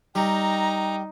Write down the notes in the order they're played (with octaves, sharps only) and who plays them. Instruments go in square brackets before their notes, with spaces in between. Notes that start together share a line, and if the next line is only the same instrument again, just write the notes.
[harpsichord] G3 [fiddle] D#4 [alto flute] G5 [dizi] A#5